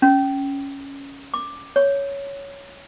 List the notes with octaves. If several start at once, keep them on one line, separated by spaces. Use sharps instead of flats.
C#4
D6
C#5